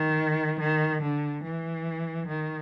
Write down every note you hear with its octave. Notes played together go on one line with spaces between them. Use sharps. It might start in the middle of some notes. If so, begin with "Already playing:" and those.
Already playing: D#3
D#3
D3
E3
D#3